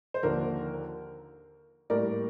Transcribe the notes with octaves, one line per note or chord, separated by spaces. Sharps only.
C5
D#2 D3 F3 A#3 A#4
A2 G3 A#3 A#4 D5